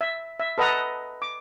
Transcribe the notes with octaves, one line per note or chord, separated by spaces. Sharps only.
E5
E5
A4 B4 D#5 F#5 A#5
D6